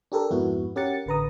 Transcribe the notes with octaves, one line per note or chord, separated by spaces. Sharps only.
D4 G4 A4 A#4
F2 G#2 B3 E4 F#4
C#4 G4 A#4 F#5 A6 C#7
A1 D3 B4 A#5 D#6